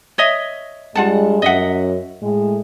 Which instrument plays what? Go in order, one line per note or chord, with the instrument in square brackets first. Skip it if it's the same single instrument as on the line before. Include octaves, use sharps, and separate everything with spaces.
[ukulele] C#5 D#5 E5
[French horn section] G2 G3 G#3 [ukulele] F4 F#5 A5
[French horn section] F#2 [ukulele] D#5 E5 F#5
[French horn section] A2 G#3